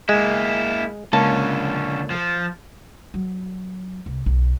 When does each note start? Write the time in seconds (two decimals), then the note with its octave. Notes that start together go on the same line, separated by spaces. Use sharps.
0.09 G#3 A#3 E4
1.13 C#2 D3 A#3 C#4 A5
2.10 F3
3.14 F#3
4.06 C2
4.26 B1